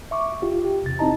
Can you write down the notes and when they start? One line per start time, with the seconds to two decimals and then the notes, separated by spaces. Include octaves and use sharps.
0.11 E5 C#6 D6
0.42 F4 G4
0.65 G4
0.84 E2 C3 A6
0.99 C4 D#4 E4 D#5 A5 A#5